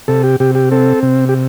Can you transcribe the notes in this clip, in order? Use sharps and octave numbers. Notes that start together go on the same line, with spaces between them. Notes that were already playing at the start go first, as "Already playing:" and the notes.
C3 A4
G4
C3 G4
G4
C4 A4
C3
G4